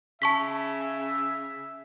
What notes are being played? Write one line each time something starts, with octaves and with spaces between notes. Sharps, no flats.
C#3 E5 A5 C#6 B6